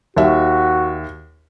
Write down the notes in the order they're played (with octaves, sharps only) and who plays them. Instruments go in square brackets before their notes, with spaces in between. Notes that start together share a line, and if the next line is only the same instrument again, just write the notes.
[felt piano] D#2 E5 [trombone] F#4